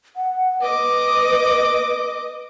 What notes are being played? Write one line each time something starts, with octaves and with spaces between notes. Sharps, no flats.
F#5
B4 D#5 D6